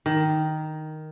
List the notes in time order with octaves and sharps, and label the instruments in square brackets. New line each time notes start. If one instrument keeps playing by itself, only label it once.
[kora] D#3